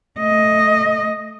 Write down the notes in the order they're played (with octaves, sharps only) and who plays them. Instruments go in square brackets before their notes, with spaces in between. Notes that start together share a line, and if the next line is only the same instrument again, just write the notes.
[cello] A3 D#5